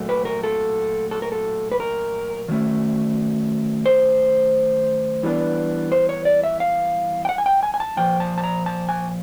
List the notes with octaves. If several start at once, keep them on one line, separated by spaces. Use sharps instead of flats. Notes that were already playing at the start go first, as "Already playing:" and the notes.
Already playing: A#2 F#3 A3
B4
A#4
A4
A4
A#4
A4
B4
A#4
D#3 F#3 A3 C#4
C5
E3 G3 B3 D4
C5
C#5
D5
E5
F5
G5
F#5
G#5
G5
G#5
G#5
A5
A#2 F3 G5
A5
A5
A#5
A5
G#5